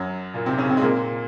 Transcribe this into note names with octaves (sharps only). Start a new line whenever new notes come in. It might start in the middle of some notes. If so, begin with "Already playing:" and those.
Already playing: F#2 F#3
A#2 A#3
C3 C4
C#3 C#4
C3 C4
G#3
A#2 A#3